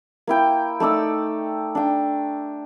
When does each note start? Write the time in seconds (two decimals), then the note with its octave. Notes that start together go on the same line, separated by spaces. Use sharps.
0.27 A#3 E4 G5
0.80 A3 D#4 D5 E6
1.75 D4 G5